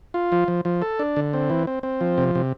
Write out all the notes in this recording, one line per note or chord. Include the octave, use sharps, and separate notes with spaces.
F4
F3
F3
F3
A4
D4
D3
C4
E3
C4
C4
F3
C3
C3